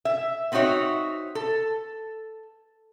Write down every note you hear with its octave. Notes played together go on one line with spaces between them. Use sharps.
E5
B3 C4 D#4 F#4 C#5 E5
A4